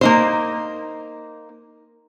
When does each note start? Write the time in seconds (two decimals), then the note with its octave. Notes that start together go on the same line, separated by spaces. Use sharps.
0.01 A#3 D#4 C5